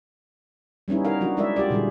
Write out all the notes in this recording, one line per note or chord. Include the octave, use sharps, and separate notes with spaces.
G3 B3 C#4 D#4 E4
D#4 A#4 F5
F#3 D4 F#4
G#3 E4 A#4 D5 E5
F4 G4 D5
A#2 D3 G3 A#3 G#4